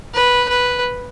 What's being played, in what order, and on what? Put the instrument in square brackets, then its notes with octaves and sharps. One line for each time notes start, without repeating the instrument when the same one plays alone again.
[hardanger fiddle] B4
B4